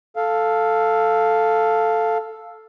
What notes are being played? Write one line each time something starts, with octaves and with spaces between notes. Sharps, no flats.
A4 F5